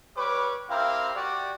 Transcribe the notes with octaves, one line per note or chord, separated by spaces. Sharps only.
G3 B4 C#5 C#6 D6
C4 E4 G4 A#4 F5
F#4 G4 D5